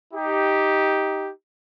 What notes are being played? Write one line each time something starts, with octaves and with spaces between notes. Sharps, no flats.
D#4 G4